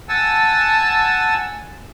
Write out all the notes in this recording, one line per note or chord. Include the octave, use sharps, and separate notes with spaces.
F#5 G#5 A5 E6